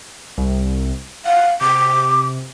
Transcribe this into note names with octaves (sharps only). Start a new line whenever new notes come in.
C2
F5 F#5
C3 D6